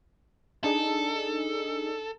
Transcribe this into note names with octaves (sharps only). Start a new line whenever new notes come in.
D4 D#4 G#4 A4